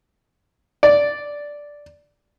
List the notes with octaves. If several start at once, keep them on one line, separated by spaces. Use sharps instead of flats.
D5